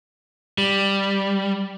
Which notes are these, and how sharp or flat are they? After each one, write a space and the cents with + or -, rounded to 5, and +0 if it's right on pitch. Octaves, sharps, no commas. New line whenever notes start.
G3 +5